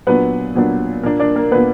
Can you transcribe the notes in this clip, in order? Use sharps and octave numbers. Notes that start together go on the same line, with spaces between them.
A#2 F#3 B3 D4 B4
A#2 F#3 B3 D4
A#2 A#3 D4 A#4
D4 D5
A#3 A#4
A#2 A#3 B3 D4 B4